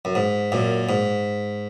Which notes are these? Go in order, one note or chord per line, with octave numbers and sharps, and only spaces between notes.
F#2
G#2
F#2 A#2
G#2